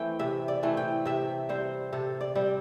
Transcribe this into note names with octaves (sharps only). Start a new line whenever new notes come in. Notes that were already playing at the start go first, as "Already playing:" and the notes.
Already playing: E3 A3 C4 G5
C3 E5
D5
E3 A3 C4
G5
C3 E5
G3 C4 C5
C3 A4
D5
G3 C4